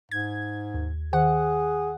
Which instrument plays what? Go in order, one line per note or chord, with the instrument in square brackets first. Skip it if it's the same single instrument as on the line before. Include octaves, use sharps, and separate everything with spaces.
[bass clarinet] G#2 [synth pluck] G#6
[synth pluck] D#2
[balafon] D#3 [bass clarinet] G#4 [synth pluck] F#5